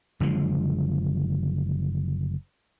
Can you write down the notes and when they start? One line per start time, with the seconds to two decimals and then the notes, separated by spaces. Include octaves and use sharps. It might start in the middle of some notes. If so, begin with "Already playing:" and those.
0.20 F#1 D3 F3 G#3